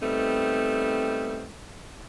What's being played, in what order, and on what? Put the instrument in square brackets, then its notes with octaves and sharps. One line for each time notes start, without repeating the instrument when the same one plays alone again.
[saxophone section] G3 A3 B3 C4 D#4